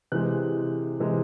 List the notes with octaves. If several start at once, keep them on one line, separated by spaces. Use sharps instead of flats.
C3 E3 G#3 F#6
C3 E3 G#3